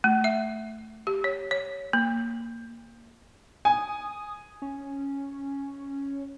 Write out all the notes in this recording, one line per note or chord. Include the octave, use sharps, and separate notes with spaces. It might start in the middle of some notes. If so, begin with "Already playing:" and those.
A3
E5
G4
C#5
C#5
A#3
G#5 D#6
C#4